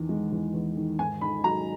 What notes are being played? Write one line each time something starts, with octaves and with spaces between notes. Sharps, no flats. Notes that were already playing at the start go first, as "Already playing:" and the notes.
Already playing: E2 D#3
G#3
E2
E2
D#3
G#2 G#5
D#3 B5
F#3 A#5